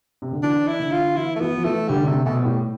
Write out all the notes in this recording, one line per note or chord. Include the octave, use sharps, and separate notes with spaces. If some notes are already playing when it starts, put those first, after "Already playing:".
C3
D3
E3 D4
E4
D3
F4
E3 E4
A3
E3 B3
F3
E3 A3
D3 G3
D3
C3 A3
B2 A3
F3
A2 G3